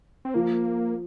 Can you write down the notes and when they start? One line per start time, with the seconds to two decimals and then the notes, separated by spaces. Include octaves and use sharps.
0.25 C4
0.34 F3 A#3